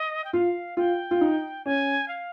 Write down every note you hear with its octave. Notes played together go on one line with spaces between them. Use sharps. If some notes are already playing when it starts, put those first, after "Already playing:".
Already playing: D#5
G5
F4 F5
F4 G5
F4
D#4
C#4 G#5
F5